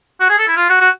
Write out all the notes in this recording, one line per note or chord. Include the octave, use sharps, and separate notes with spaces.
F#4
G#4
A4
E4
F4
F#4
F#4